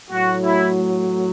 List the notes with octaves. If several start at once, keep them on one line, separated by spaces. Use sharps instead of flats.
A2 F#3 F#4
E4